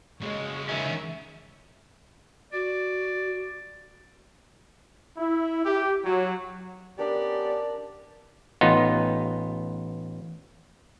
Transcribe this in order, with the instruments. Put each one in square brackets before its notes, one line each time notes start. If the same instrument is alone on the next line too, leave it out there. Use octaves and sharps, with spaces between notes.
[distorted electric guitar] C#3 F#4 [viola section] G#3 [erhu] C#5
[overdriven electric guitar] D#3 C#4 [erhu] E5
[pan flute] F#4 [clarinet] D5
[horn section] E4
G4
F#3
[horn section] B3 C#4 G4 [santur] D4 A#4 [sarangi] D5
[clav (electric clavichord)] A1 B3 D#4 F4